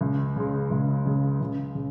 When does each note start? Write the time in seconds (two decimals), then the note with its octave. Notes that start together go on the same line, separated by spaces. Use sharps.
0.01 C#2
0.36 C#3 G#3
0.71 C#2
1.06 C#3 G#3
1.41 C#2
1.75 C#3